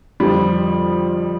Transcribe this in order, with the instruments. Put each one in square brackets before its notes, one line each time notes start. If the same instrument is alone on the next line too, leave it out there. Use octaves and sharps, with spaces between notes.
[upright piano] F2 D3 F3 G3